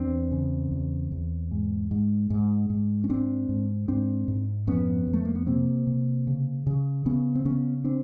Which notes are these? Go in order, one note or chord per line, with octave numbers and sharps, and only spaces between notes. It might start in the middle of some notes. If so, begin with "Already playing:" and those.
Already playing: E2 C4 D4
C#3
E2
E2
G#2
G#2
G#2
G#2
C#4
G#2 C4 D4
G#2
G#2 C4 D4
G#2
F2 B3 C#4
F2
A3
A#3
B3
C3 A#3 C4
C3
C#3
C#3
C#3 B3 C#4
C4
C#3 B3 C#4
C4 D4